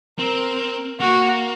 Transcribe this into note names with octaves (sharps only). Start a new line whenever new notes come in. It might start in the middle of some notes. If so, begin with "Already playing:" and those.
C4 A#4
A#3 F#4